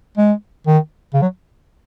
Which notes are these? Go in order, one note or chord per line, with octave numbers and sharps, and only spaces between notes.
G#3
D#3
C#3
F#3